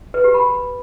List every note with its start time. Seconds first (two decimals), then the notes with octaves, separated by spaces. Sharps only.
0.14 B4
0.24 G4
0.34 B5